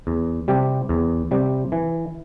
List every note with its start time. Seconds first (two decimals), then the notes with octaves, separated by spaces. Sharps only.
0.07 E2
0.48 C3 G3 C4 G4
0.89 E2
1.31 C3 G3 C4 G4
1.72 E3